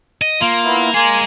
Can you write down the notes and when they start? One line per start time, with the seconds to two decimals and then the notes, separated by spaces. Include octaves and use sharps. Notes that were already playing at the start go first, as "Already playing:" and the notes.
0.22 D#5
0.41 A#3 F4
0.64 B3 E4
0.94 G#3 A#3 G#4 G#5 C6